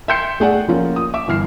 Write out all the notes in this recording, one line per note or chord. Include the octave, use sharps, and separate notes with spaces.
E5 G5 C6 G6 C7 C#7
A3 G#4 D5 F#5
F3 A#3 C#4 F4
D#6
E5 D6
G1 E3 F6 C7